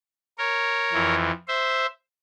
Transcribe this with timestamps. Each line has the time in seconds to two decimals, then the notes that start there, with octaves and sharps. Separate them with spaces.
0.38 A#4 C#5
0.93 F2 E3
1.48 C5 E5